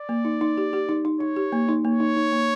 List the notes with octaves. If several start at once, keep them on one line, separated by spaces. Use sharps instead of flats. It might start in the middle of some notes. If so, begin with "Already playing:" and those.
Already playing: D5
A#3
D#4
D#4
G4
G4
D#4
D#4
D#4 C#5
G4
A#3
D#4
A#3 C#5
D#4
D#4
A#3